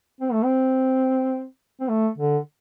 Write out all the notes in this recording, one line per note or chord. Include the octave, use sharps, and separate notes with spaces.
C4
A3
C4
C4
A3
D3